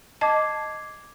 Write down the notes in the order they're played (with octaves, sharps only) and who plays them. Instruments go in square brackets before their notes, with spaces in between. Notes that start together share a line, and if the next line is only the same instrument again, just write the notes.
[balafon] D#5 A5 [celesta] D6 G#6 C7